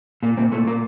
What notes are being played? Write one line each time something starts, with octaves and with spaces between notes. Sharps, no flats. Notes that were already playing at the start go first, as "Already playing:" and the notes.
A#2 A#3
A#2 C4
A#2 A3
A#2 A#3